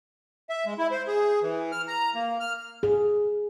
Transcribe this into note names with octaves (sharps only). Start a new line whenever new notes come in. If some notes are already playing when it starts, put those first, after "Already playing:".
E5
G#3
E4
C5
G#4
E3
F6
A#5
A#3
F6
G#4